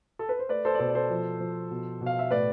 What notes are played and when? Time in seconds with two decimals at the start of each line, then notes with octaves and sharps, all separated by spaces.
0.19 A4
0.29 B4
0.39 C5
0.49 A3 B4 D5
0.65 A4 C5
0.75 D5
0.79 B2 A4 C5
0.90 D5
0.95 A4 C5
1.10 F3
1.40 F3
1.71 B2
2.01 B2
2.06 F5
2.19 E5
2.31 A2 B4 D5